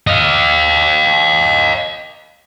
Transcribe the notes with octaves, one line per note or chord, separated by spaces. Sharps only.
D#5 F5